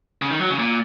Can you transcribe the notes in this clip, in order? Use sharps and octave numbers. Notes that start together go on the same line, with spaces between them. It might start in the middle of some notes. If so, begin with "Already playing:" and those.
C#3
D#3
F#3
C#3
A#2